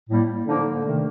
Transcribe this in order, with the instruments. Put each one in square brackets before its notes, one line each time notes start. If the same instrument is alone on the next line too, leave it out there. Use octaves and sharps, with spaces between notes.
[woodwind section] A2 G3 A#3
[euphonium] D3 [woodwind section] F3 A#3 D#4
[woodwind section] C3 D#3 A3